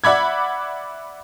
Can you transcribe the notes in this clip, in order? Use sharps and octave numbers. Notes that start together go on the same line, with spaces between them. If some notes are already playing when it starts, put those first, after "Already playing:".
D5 E5 F#5 B5 D6 G#6